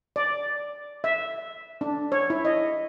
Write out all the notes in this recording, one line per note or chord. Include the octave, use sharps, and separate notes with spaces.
D5
E5
D4
C#5
E4
D#5